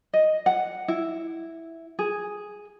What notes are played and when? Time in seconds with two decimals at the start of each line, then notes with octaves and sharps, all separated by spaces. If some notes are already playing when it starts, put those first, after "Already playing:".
0.13 D#5
0.46 F#5
0.88 E4
1.99 G#4